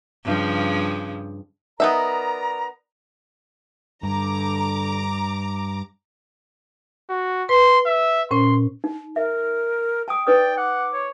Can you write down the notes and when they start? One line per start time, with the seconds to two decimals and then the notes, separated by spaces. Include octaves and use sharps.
0.24 G2 C#3 F3
1.80 B3 D#4 A#4 D5 E5 A#5
4.03 G2 D3 A#5 D6
7.09 F#4
7.49 B4 C6
7.86 E5
8.31 A#2 C#4 C5 C6
8.84 D#4
9.16 A#4 E5
10.08 G5 A5 D#6
10.27 D#4 B4 D5 G5 D#6
10.58 F#5 D6
10.93 C#5